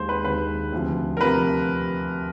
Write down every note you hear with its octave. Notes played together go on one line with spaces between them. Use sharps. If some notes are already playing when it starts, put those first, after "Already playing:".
Already playing: D#2 D#3 G#3 C5
B4
D#2 D#3 G#3 B4
D2 C3 F3
A#4
C3 F3 B4